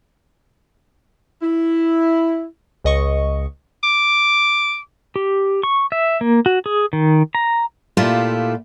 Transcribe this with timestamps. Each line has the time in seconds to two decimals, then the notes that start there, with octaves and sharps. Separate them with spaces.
1.42 E4
2.84 C#2 D#5 C#6
3.84 D6
5.16 G4
5.63 C#6
5.92 E5
6.21 A#3
6.46 F#4
6.66 G#4
6.93 D#3
7.35 A#5
7.97 A#2 A3 E4 F4 G4